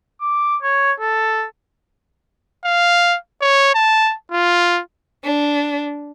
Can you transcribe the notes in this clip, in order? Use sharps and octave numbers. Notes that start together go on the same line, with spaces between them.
D6
C#5
A4
F5
C#5
A5
F4
D4